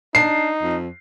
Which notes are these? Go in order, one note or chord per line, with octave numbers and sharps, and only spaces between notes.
D4 D#4 C7
F2